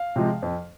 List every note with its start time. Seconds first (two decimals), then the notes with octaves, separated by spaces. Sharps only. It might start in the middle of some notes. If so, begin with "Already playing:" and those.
Already playing: F5
0.16 C3 F3 G#3
0.42 F2